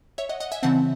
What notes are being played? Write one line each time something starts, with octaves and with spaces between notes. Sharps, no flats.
C#5 E5
D#5 F#5
D#5 F#5
E5 G#5
C#3 E3 C4 F#5 A5